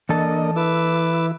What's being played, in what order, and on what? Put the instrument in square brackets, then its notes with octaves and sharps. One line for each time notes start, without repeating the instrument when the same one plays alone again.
[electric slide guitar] E3 A4 A5 [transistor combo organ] A#3 D4 D#5
[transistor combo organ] E4 [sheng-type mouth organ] B4 D6 E6